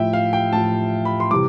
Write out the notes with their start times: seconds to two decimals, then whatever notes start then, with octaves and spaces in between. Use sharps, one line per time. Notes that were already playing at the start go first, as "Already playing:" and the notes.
Already playing: A2 F3 E5 G5
0.13 F5
0.33 G5
0.52 A2 F3 A5
1.05 B5
1.20 C6
1.30 C3 E3 G3 D6